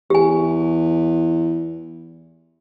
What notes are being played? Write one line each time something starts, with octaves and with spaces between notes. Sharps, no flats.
E2 G4 G#5